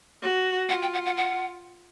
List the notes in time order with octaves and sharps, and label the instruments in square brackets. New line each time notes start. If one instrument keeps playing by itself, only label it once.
[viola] F#4
[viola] F4 [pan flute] F#5
[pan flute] G5
F#5
F#5
F#5